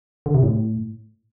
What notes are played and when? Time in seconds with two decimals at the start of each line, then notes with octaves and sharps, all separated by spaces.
0.26 D3
0.35 C3
0.43 A2